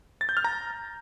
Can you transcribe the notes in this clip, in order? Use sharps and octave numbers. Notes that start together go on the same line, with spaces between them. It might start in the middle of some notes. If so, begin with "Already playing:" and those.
A6
G6
F6
A#5